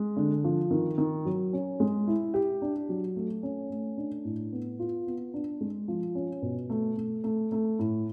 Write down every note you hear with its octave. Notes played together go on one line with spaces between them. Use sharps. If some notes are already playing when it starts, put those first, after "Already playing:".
Already playing: G#3
D3
F3
D#3
D#3
F#3
C#4
G#3
E4
G4
D4
F#3
A3
C#4
A3
D4
A2
B3
F4
B3
D4
G#3
F3
C#4
B2
A3
A3
A3
A3
A2